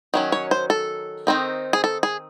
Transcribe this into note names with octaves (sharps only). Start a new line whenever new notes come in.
D#3 F#3 C#4
C#5
C5
A4
D#3 F#3 C4 D#4
G#4
A4
G#4